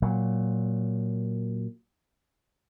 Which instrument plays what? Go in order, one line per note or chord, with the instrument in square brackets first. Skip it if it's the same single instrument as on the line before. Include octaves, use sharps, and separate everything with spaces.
[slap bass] A#2 F#3